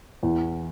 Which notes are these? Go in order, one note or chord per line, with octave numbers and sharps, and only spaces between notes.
E2